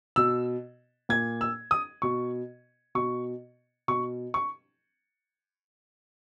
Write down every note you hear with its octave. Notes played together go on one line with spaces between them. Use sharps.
B2 E6
A#2 G#6
E6
D#6
B2 C#6
B2 C#6
B2 C#6
C#6